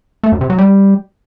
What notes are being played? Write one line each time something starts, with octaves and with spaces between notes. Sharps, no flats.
A3
F#2
C3
F#3
G3